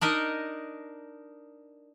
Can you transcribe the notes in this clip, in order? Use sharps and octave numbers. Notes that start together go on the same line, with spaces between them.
D4 D#4 A#4 D#5